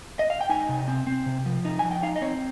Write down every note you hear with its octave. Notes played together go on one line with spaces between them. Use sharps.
D#5
F5
G5
D#4 G#5
C3
C4
C4
C3
F3
D#4
F3 G#5
G5
D#4 F5
D#5
C4 C#5